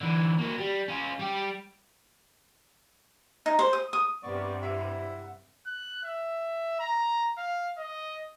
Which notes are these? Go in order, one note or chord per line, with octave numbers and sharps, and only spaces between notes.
D3 E3
A#3 F#4
G3
C#4 F4
G3 G4
D#4
C5
D#6
D#6
G2 C3 G3 B3 D5 C#6
E4 E5 F#5
F#6
E5
A#5
F5
D#5